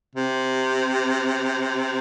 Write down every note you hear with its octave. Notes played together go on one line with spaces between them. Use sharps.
C3